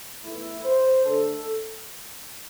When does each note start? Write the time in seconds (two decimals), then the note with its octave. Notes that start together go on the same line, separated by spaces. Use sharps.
0.23 E2 E3 A3 E4
0.65 C5
1.05 D3 A3 D4 A4